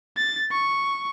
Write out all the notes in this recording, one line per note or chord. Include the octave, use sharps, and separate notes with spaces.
A6
C#6